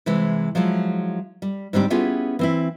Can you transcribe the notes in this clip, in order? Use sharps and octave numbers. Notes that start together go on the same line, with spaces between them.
C3 E3 G#3
F3 F#3 G#3 E4
G3
G#2 D3 G3 C4 D4 G4
B3 C#4 E4 F4 G4 G#4
E3 C4 E4